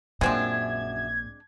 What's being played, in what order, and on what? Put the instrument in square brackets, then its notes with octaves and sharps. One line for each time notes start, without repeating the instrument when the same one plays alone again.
[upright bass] A#1 A#2 [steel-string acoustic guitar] F#2 E5 [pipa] G#3 C4 D4 [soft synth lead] G#6